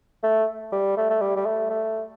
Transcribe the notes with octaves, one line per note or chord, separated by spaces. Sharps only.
A3
G3
A3
A3
G3
G3
A3
A3